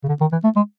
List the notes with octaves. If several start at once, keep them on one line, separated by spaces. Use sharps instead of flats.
C#3
D3
D#3
E3
A3
G#3